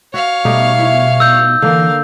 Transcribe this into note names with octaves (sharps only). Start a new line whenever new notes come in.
F#4 C#5 F5
B2 G3 A3 D#4
E4
D#4 E6 G6
D3 E3 A#3 A#4 F5